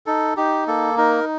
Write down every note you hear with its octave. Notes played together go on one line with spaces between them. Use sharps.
D#4 A4
D#4 G4
A#3 A4
D#4 A#4